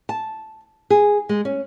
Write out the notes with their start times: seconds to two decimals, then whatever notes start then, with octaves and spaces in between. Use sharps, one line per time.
0.09 A5
0.90 G#4
1.29 G#3
1.45 C#4